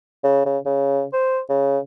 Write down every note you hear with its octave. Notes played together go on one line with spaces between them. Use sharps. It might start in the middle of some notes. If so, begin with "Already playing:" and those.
C#3
C#3
C#3
C5
C#3